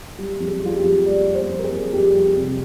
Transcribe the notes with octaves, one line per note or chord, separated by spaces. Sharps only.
G3 G4
F2
G#4
G3 F4
G4
F2
G3 D5
G3
C5
F2
A#4
G#4
F2
F2 G4
G3
C3